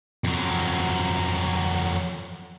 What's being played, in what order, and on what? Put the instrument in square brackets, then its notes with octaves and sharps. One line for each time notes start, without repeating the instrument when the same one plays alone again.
[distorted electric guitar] F2 F#3